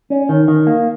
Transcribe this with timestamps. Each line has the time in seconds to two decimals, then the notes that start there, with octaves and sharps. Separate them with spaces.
0.10 C#4
0.29 D#3
0.48 D#3
0.67 A#3